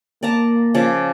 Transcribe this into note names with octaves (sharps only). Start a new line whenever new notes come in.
A#3 D5 A5 A#5
C#3 F3 D5